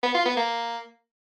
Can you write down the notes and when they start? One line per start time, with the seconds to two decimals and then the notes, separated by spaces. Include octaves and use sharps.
0.03 B3
0.14 F4
0.25 B3
0.37 A#3